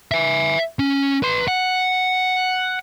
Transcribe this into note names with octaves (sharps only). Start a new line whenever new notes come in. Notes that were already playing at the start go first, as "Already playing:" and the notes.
E5 G#5
C#4
B4 C6
F#5